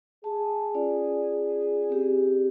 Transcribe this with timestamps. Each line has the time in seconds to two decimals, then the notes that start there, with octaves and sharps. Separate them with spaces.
0.24 G#4 A5
0.74 C#4 F4 D5
1.90 C4 G4